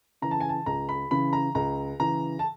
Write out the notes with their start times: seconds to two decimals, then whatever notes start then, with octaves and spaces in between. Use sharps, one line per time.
0.22 C#3 E3 A#5
0.31 A5
0.40 G#5
0.49 A5
0.66 C#2 A#5
0.89 B5
1.11 C#3 E3 B5
1.33 A#5
1.55 C#2 A#5
2.00 C#3 E3 A#5
2.39 A5